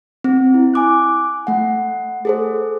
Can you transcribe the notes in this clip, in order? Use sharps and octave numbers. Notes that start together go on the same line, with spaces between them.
C4
E4
G#5 D6 F#6
A3 F#5
G#4 A4 C5